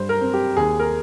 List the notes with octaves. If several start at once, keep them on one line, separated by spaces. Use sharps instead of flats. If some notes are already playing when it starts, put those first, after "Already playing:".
Already playing: G2 G3 C5
A#4
C4
G4
D#2 G#4
A#4